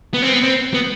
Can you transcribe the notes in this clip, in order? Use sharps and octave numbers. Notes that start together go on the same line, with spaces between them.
B3
C4
B3
C4
B3